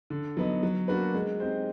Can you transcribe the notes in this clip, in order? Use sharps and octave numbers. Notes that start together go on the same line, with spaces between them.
D3
F#3 B3 D#4
F#3
A#3 D4 F#4 B4
G#3
C4 D#4 G4 C5